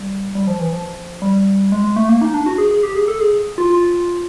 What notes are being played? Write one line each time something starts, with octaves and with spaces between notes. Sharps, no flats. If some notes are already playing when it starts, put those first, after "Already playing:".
Already playing: G3
G3
F3
E3
F3
G3
G#3
G#3
A3
A#3
D#4
D4
F#4
G#4
G#4
G4
G#4
A4
G#4
F4
F4